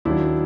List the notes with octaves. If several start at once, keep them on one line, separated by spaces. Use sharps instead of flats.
D#2 D#3 F#3 D4 E4